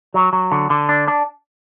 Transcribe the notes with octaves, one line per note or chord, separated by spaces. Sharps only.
F#3
F#3
D3
D3
D4
D4